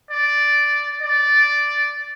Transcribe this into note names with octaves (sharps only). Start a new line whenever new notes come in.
D5
D5